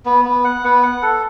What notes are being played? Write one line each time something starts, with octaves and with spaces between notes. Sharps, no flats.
B3
B3
F#5
B3
F#5
A4